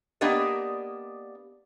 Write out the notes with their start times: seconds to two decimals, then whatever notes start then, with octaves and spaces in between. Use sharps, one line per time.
0.21 A#3 B3 D4 G4 D5 D#5